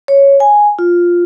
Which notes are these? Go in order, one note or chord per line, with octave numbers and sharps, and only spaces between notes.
C#5
G#5
F4